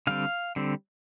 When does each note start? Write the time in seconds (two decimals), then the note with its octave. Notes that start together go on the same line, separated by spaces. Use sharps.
0.07 D3 G3 C4 F5
0.56 D3 G3 C4